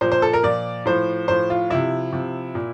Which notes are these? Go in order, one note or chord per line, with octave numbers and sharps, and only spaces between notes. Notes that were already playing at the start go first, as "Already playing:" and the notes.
A#2 F3 C5
C5
A4
A#4
A#2 F3 D5
A2 F3 C5
A2 F3 C5
F4
C3 F3 E4
C3 F3
A#2